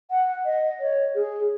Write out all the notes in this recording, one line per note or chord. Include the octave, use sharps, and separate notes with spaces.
F#5
D#5
C#5
G#4